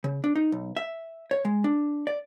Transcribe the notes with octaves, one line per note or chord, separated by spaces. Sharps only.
C#3
D4
D#4
B1
E5
C#5
G#3
D4
D5